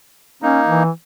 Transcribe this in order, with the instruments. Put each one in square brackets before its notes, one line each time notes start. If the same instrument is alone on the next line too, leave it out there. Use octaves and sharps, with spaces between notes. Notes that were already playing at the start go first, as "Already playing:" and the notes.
[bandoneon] A#3 D#4 [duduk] C#4
[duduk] E3